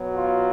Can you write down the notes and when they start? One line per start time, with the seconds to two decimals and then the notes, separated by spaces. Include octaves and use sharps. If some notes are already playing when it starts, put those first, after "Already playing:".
Already playing: B2 F#3
0.14 F4